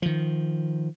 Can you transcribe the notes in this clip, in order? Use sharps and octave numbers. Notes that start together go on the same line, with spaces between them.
D#3 F3